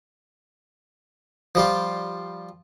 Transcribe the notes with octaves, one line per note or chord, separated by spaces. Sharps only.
F3 G3 F4